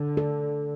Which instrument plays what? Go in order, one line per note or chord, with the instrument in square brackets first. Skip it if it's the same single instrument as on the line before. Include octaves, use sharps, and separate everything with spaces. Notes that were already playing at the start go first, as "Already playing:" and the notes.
Already playing: [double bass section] D3
[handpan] A4